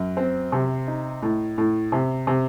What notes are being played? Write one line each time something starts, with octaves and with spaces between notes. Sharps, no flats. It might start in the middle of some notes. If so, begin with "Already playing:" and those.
Already playing: F#2
C4
C3
D#4
A2
A2
C3
C3